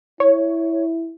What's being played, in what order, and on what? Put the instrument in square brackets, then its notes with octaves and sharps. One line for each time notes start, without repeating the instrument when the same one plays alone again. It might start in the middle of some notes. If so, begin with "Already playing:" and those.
[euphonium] E4 [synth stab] C#5